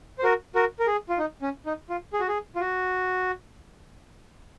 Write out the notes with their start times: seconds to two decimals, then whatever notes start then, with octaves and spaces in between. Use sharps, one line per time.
0.19 C5
0.24 F#4 A#4
0.55 F#4 A#4
0.80 A#4
0.87 G#4
1.09 F4
1.18 D#4
1.42 C#4
1.66 D#4
1.89 F4
2.13 G#4
2.20 F#4
2.28 G#4
2.56 F4
2.61 F#4